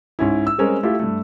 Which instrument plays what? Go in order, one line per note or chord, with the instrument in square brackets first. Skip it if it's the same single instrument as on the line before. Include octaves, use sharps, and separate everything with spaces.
[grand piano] G#2 C#4 E4
E6
G3 G#3 C4 C#4 G#4 A#4
A3 E4 F4 G4
G2 A3